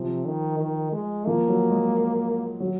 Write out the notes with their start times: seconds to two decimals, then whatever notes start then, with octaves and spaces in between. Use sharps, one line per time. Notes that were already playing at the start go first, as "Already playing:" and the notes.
Already playing: C3 F3
0.26 D#3
0.60 D#3
0.93 G#3
1.27 F3 A#3
1.48 F#3
1.71 G#3
2.60 F#3